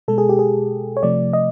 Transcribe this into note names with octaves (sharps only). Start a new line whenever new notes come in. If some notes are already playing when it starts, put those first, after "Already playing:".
B2 G#3 A4
G#4
G4
G#4
C#5
C3 F3 A3 D5
D#5